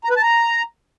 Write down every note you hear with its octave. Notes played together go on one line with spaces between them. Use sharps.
A#5
B4
A5
A#5